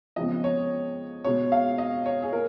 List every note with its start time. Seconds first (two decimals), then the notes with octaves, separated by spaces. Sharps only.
0.16 F2 C#3 F3 G#3 B3 D#5
0.44 C#5
1.24 B2 G#3 B3 C#5
1.52 F5
1.78 D#5
2.06 C#5
2.22 G#4
2.33 A#3 A#4